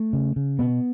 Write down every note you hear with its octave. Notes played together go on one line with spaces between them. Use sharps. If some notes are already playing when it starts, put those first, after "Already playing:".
Already playing: A3
C#3
C#3
B2 B3